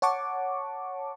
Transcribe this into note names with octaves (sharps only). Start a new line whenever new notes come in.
C#5 F#5 A5 C#6 D6